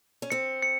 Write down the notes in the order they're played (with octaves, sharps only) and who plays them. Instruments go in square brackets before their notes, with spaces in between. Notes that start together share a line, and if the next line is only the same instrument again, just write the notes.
[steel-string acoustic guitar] C#4
[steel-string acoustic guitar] C4 [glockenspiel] C#7
[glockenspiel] C#7